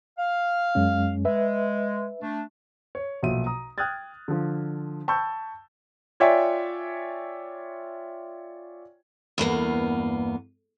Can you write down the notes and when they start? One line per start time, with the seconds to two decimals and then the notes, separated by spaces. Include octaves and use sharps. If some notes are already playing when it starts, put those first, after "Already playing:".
0.18 F5
0.75 F#2 G#3 C#4
1.25 G#3 B4 E5
2.22 A3 D4
2.95 C#5
3.23 B1 A#2 F3 F#3 E5 D#7
3.46 A#5 D#6
3.78 G5 D#6 F6 F#6 G#6 A6
4.28 D3 F3
5.08 G5 A5 B5 C#6 E6 G6
6.20 F4 C#5 D5 E5 G5 G#5
9.38 E2 G2 A#3 B3